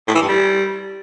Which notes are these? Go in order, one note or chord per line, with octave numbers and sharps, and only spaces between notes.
A2
E3
G2
G3